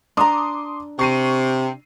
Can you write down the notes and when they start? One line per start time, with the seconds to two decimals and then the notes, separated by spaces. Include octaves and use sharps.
0.17 D4 A5 A#5 C6 D6 D#6
0.99 C3 C#6 C7 D#7